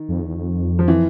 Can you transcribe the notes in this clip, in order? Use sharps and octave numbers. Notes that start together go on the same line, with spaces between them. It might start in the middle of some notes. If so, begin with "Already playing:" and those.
Already playing: D#3
F2
E2
F2
F3
E3